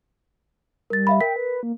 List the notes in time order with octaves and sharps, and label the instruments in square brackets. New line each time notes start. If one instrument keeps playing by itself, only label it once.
[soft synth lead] G3 [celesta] A#4 A6
[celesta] E5 F5 B5
[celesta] A#4 B6 [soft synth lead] G5
[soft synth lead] B4
A#3